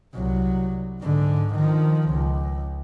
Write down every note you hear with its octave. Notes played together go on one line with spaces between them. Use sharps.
C2 F#3
G#2 D3
D#3 F3
C#2